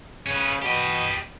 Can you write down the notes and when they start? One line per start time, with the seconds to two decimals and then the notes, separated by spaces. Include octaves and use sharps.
0.26 C#3 C#4 B4
0.62 B2 G4 D#5